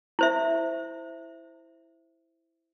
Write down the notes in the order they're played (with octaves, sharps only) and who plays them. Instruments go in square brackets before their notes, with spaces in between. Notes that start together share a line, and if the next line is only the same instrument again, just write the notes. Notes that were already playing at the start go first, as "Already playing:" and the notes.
[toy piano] E4 C5 E5